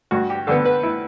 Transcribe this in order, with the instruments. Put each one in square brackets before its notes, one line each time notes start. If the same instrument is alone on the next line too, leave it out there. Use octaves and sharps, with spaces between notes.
[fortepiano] G2 F#4
G4
D3 G3 B3 A4
B4
E4